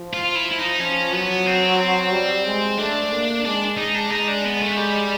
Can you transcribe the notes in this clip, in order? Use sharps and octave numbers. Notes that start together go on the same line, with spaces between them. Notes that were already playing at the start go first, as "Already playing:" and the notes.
Already playing: F3
F4
E4
E4
D#4
F3 C#4
F#3 B3
C4
G3
G#3
A3 D4
A#3
G#3 D4
G#3 D#4
D4
G#3 D#4
D4
B3
A3
G3